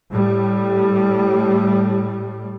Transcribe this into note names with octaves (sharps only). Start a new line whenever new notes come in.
A2 G3